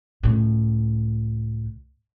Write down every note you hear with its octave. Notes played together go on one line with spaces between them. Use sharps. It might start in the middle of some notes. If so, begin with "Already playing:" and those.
C#2 A2